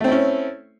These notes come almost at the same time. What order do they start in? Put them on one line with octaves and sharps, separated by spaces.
A3 C4 E4 C#4